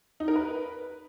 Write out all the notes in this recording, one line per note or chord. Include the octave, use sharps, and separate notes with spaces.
D#4
A#4
B4